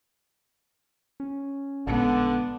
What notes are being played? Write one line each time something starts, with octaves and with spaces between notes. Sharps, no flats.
C#4
A1 A#2 D3 G#3 B3